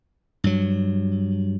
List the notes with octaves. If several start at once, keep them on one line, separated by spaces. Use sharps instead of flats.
G2 F#3